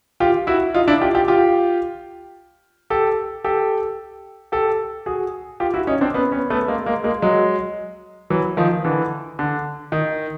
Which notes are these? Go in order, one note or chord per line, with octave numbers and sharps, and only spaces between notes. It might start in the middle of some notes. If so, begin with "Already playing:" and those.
F4 G4
E4 F#4
D#4 F4
D4 E4
F4 G4
F4 G4
F4 G4
G4 A4
G4 A4
G4 A4
F#4 G#4
F4 G4
E4 F#4
C#4 D#4
C4 D4
B3 C#4
B3 C#4
A3 B3
G#3 A#3
G#3 A#3
G#3 A#3
F#3 G#3
E3 F#3
D#3 F3
D3 E3
D3
D#3